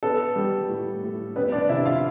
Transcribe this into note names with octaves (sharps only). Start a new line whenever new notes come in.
B3 A4
G3
A2
A2
B3 C4 B4
D4 D5
C3 E4 E5
F4 F5